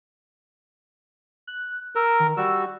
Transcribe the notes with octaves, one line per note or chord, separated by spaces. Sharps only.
F#6
A#4 E6
D#3
G3 F#4 E6